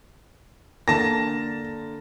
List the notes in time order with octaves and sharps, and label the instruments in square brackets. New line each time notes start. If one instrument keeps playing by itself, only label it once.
[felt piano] D3 A#3 [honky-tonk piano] A5 A#6